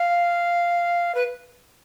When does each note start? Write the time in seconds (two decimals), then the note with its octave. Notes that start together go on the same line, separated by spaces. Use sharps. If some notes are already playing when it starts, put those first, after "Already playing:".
Already playing: F5
1.15 B4